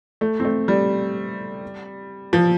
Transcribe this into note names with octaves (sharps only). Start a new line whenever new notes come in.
A3
C4
A3
G3
F3